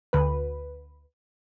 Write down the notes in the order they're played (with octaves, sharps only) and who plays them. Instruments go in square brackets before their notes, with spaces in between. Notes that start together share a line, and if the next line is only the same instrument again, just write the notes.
[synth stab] D2 B4